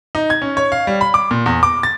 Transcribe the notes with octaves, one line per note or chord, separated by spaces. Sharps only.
D#4
G#6
C#4
C#5
F5
G3
B5
D6
A#2
E2
D6
A6